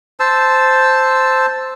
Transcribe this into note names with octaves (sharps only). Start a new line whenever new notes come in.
C5 A5 E6